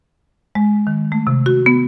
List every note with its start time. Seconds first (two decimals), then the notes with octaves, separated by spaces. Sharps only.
0.55 G#3
0.87 D#3
1.12 A3
1.27 C3
1.46 F#4
1.66 B3